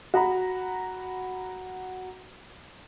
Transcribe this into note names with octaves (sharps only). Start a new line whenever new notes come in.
F#4 A#5 B5